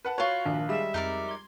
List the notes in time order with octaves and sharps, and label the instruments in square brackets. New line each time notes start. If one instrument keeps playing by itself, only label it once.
[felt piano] B4 F#5 A5
[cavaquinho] F4 B4 [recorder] F#4 [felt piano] C#5 C#6
[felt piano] A#1 [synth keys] D#3 D4
[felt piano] G3 G#3 [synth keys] G#4 E7 [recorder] E5
[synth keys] F2 [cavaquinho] D#4 A#4 D5
[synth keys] C6 G#6